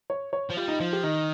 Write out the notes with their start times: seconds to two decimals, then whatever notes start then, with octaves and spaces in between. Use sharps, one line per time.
0.10 C#5
0.33 C#5
0.50 F3
0.57 G3 F4
0.68 D#4
0.80 F3 F4
0.93 G4
1.04 D#3 D#4